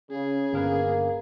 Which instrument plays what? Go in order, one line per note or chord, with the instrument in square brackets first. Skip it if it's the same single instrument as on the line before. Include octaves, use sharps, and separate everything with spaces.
[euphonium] C#3 [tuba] C#4 [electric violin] G#4
[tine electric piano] G1 A#4 B4 [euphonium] A#3